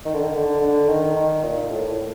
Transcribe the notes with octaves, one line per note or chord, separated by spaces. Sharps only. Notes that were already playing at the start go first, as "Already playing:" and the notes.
D#3
D3
D#3
D3
D3
D#3
D#3
A#2
A2
A2